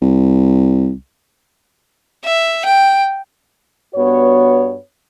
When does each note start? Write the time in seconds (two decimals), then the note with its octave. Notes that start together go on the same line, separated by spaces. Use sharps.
0.02 C2
2.25 E5
2.65 G5
3.95 G2 B3 F#4 C#5